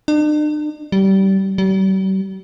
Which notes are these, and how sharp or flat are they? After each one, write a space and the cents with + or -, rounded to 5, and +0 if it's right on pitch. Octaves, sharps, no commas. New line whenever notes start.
D4 +45
G3 -25
G3 -45